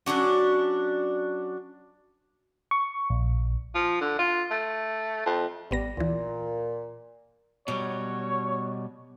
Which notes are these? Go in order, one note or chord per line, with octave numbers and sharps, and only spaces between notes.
F#3 C#4 D4 F#4
C#6
A#1
F3
D3
F4
A3
F2
A1 G3 B3 A#6
D2 A#2 E3
B2 F#3 G3 C#5